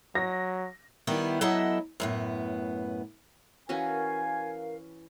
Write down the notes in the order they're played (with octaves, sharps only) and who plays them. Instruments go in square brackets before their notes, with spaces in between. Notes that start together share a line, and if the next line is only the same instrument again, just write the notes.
[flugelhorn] F#3 [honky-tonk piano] A#6
[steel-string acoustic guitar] D#3 G3 B3 E4
F#3 B3 E4 A4 D#5 E5
F#2 A2 B3
[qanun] E3 C#4 F#4 [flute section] A#4 F5 [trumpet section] G#5